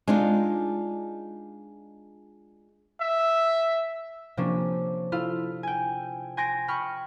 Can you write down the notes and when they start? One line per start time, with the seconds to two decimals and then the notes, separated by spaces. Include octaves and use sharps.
0.07 G#3 D4 D#4 F4
3.01 E5
4.37 C3 F3 A#3 C#4 D4
5.12 E4 F4 A4 F5
5.63 G5 G#5
6.37 G#5 C6 G6 A#6 D7
6.68 G5 B5 C#6 D#6 F6 C#7